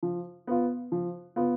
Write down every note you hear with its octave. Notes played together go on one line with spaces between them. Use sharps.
F3
B3 F4
F3
B3 F4